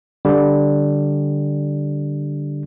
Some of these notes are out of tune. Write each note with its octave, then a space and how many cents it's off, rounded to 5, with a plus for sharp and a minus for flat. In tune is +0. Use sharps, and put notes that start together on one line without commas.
D3 +0 G3 +0